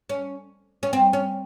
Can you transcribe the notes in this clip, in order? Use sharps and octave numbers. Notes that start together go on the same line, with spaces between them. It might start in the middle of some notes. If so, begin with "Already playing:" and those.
C#4
C#4
C4
C#4